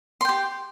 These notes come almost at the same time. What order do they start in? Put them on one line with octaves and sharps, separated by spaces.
C6 G5 G4